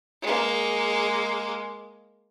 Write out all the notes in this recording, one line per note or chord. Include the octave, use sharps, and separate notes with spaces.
G#3 A#3